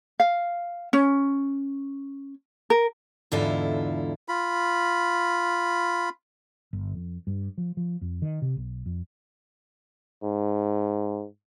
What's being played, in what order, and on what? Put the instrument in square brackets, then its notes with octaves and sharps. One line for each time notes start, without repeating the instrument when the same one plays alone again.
[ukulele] F5
C#4
A#4
[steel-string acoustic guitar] E2 G#2 D3 E4 F4 A4
[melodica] F4 B5
[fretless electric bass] G1
F2
G2
F3
F3
F2
D#3
C3
B1
F2
[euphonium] G#2